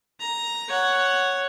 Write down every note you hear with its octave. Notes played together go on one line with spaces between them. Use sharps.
A#5
C#5 F#5